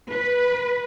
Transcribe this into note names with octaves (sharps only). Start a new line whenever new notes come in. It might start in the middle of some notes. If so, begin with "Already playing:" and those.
B4